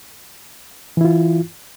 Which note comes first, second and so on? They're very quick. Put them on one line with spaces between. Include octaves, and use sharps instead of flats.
E3 E4 F4